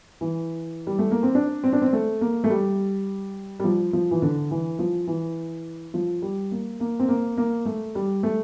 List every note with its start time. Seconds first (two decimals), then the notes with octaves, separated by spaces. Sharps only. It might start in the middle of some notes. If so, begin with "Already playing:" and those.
0.21 E3
0.87 G3
0.99 A3
1.11 A#3
1.23 C4
1.35 D4
1.64 C4
1.73 D4
1.82 C4
1.93 A3
2.21 A#3
2.44 A3
2.50 G3
3.60 G3
3.64 F3
3.93 F3
4.11 E3
4.22 D3
4.51 E3
4.79 F3
5.07 E3
5.94 F3
6.22 G3
6.51 A#3
6.80 A#3
7.00 C4
7.08 A#3
7.37 A#3
7.66 A3
7.95 G3
8.23 A3